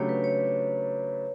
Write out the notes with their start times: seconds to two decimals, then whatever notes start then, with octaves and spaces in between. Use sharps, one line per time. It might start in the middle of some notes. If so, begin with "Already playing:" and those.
Already playing: C#3 F#3 A3 D4 G4 C#5
0.09 B4
0.24 C#5